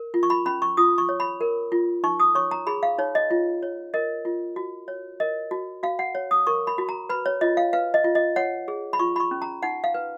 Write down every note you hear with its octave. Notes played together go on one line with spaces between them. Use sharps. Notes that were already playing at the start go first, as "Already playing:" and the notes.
Already playing: A#4
F4
C#6
B5
C#4 B5
C#6
F4 D#6
C#6
C#5
B5
A#4
F4
D#4 C#6
D#6
C#5 C#6
A#5
G#4 B5
F5
D#4 C#5
D#5
F4
C#5
A#4 D#5
F4
F#4
C#5
A#4 D#5
F#4
F#4 F5
F#5
C#5
D#6
A#4 C#6
B5
F#4
A#5
B4 B5
C#5
F4 D#5
F5
B4 F5
D#5
F4
D#5
C#5 F#5
G#4
B5
F4 C#6
B5
C#6
C#4
A#5
D#4 F#5
F5
B4